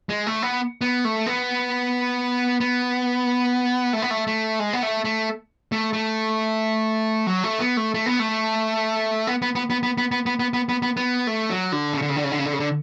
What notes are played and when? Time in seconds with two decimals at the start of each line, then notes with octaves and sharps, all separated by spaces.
0.09 G#3
0.26 A3
0.42 B3
0.81 B3
1.05 A3
1.26 B3
2.60 B3
3.93 A3
4.02 B3
4.11 A3
4.27 A3
4.60 G#3
4.73 B3
4.83 A3
5.05 A3
5.72 A3
5.93 A3
7.27 F#3
7.43 A3
7.60 B3
7.77 A3
7.94 A3
8.06 B3
8.20 A3
9.27 B3
9.42 B3
9.55 B3
9.70 B3
9.83 B3
9.98 B3
10.12 B3
10.26 B3
10.39 B3
10.53 B3
10.69 B3
10.82 B3
10.97 B3
11.27 A3
11.50 F#3
11.72 D3
11.94 C#3
12.02 D3
12.09 C#3
12.16 D3
12.24 C#3
12.31 D3
12.39 C#3
12.46 D3
12.53 C#3
12.60 D3